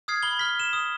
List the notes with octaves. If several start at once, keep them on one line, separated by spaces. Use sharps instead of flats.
D#6 F6 G#6 C7
B5 G7
F6 B6
E7
D#6